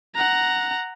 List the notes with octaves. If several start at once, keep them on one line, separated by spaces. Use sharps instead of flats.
F#5 A#5